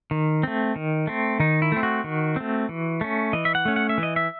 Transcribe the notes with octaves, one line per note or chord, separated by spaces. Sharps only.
D#3
A3 C4
D#3
A3 C4
D#3 D#4
E4
A3 C4
F#4
D#3
A3 C4
E3
A3 C#4
E3 D#5
E5
F#5
A3 C#4
F#5
E5
E3
D#5
E5